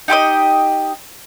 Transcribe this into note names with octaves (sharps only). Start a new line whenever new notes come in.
D#4 G4 C5 D#5